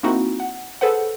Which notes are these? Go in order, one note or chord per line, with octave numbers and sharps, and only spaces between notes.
A#3 C4 D#4 E4 F#4
F#5
G#4 A4 B4 C5 F#5